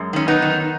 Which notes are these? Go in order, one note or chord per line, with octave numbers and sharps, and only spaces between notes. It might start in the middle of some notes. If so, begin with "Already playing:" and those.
Already playing: F#2 G#3
D#3 C#4
B3 D#4
D#3